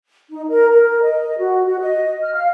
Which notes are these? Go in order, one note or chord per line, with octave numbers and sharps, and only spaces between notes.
D#4
A#4
A#4
D#5
F#4
F#4
D#5
F6
F5